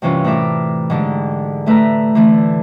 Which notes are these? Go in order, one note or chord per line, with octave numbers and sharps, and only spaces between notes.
G2 C3 E3 C#4 F4
A2 E4 A#4 E5 D6
G#2 D3 G#3 G4
A2 A3 B4 E5 A#5
D3 E3 A3